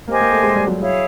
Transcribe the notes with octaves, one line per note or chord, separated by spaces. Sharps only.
A#3 G4 C5 D#5 G#5
A#3
A3
G#3
G3
F#3
E4 G#4 C#5 F5